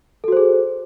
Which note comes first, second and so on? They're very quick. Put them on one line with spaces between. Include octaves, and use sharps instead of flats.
A4 F#4 C5 G#4